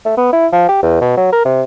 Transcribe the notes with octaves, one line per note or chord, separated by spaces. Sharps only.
A3
B3
E4
F3
G4
E2
B2
F#3
A#4
C3